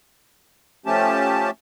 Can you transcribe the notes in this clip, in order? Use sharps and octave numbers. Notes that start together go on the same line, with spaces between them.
F3 A3 C#4 G4 A5